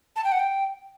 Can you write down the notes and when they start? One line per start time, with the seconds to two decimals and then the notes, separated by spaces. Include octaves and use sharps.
0.16 A5
0.24 G5
0.32 F#5
0.39 G5